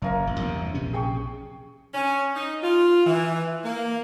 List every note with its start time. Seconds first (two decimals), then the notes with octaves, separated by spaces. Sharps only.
0.02 F#1 F#2 A#3 A#4
0.27 A1
0.40 E2 G2 C3
0.74 A#1 C3 C#4
0.93 G#4 G5 C#6
1.94 C#4
2.35 D#4
2.63 F4
3.06 E3
3.64 A#3